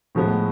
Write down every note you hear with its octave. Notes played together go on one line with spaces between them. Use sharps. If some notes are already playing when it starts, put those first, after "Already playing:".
A2 F3 G#3 B3